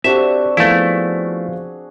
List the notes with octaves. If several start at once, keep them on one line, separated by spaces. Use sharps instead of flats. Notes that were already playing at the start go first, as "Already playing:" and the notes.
C4 D4 F#4 G4 A4 E5
F3 A3 B3 E4 G#4 F5